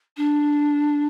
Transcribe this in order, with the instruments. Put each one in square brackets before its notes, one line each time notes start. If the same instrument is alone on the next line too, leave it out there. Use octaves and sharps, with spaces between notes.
[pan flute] D4